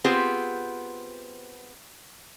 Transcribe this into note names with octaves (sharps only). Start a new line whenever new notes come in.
B3 C4 F4 G4 G#4 C5